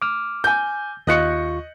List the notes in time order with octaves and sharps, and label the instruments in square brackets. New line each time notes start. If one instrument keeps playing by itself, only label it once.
[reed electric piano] D6 F6
[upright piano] G#5 G6
[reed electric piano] D#2 F4 C#6 [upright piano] D#5 F#6 C#7